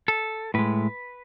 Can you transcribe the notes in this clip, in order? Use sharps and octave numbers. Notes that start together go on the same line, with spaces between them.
A4
A2 G#3 B4